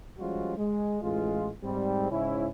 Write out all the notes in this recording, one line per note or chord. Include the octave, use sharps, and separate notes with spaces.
F3 G3 G#3 C#4 F4 F#4
G#3
A1 G#3 F4
G#2 G3 C4
G#2 C#3 C#4 E4